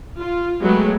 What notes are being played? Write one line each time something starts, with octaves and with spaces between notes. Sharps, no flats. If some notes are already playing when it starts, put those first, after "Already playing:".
F4
F#3 G#3 A3 B3 G4